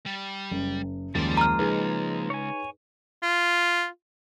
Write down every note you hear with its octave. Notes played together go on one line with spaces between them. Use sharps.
G3
F#1
F#1 D#2 F3 G3 G#3 A#3 D5
A#5 F6
C#2 D#4 G#4 B4
C#5 G#5
F4